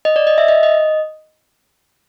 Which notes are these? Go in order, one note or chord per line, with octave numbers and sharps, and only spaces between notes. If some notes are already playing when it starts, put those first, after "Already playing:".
D#5
D5
D#5
E5
D#5
D#5